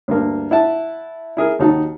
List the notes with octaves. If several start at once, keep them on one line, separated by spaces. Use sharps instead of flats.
D2 G2 A#3
E4 E5 F#5 A5
E4 G#4 A#4
D#2 D#4 F#4 A5